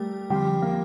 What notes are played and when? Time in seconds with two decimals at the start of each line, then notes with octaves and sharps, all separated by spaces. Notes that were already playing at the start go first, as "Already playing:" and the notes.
Already playing: G3 A3 G4 A#4
0.30 D3 F3 G3 C4 G4
0.62 A#3 A#4